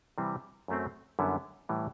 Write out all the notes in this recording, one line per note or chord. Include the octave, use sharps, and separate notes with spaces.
C3 E3 G3 C4
F#2 F#3 A3 C4
F#2 D3 G3 B3 E4
A2 E3 G3